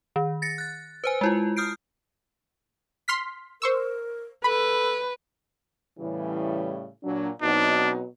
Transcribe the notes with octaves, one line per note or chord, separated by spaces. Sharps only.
D#3
A6 A#6 C#7
F#6 A6
B4 C5 G#5
G#3 E4 F4
D#6 F6 G6 C7 D7
C6 F6 B6
A#4 C5 C#6 E6
A4 B4 B5
A2 C#3 E3 G3
A#2 F#3 D4
B2 F#3 C4 D4 D#4